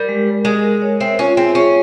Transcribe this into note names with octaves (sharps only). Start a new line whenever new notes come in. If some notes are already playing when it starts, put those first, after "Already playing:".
Already playing: G3 A#4
G#3
A#4
G#3 A#4
A#4
C#5
C4 E5
C#4 F4
C4 G#4
C#4 E5